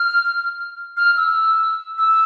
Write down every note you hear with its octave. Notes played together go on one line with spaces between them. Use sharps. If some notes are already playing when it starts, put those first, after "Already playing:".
Already playing: F6
F6
E6
E6